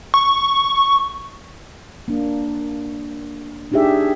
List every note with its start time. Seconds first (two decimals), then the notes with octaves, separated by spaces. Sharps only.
0.14 C#6
2.08 A#3 D4
3.72 D4 D#4 G4 G#4 E5